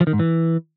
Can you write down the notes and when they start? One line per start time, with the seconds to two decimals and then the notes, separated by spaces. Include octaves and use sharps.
0.01 F3
0.07 D#3
0.13 G#2
0.19 E3